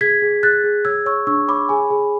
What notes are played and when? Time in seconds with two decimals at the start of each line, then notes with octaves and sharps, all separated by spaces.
0.01 G#4 G#6 B6
0.22 G#4
0.43 G#4 F#6 A6
0.64 G#4
0.85 C#5 E6 G#6
1.06 C#5 C#6 E6
1.27 D4 C#6 E6
1.48 C#5 B5 D6
1.69 G#4 G#5 B5
1.90 G#4